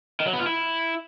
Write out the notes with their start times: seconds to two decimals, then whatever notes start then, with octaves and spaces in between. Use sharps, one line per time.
0.20 D#3
0.27 F#3
0.33 B3
0.40 F4
0.46 E4